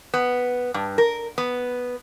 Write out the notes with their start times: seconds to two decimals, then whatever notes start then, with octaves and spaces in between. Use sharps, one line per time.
0.14 B3
0.74 G2
0.98 A#4
1.38 B3